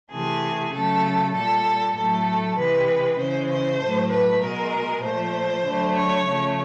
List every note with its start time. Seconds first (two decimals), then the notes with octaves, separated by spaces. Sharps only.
0.10 C3 E3 A3 G#4
0.72 C#3 F#3 A3 A4
1.33 A#2 G3 A4
1.94 A2 F#3 A3 A4
2.56 C3 E3 G#3 B4
3.18 C#3 E3 G#3 C5
3.49 C5
3.80 A2 F#3 A3
4.10 B4
4.40 B2 G#3 A#4
5.02 A#2 F3 A3 C5
5.63 D3 F#3 A3
5.95 C#5
6.25 C#3 F3 A3